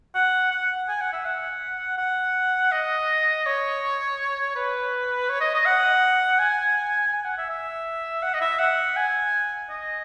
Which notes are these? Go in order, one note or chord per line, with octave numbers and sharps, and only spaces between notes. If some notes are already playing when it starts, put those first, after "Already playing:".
F#5
F#5
G#5
F#5
E5
F#5
F#5
D#5
C#5
B4
C#5
D#5
D#5
F#5
G#5
G#5
F#5
E5
E5
F#5
D#5
E5
F#5
G#5
D#5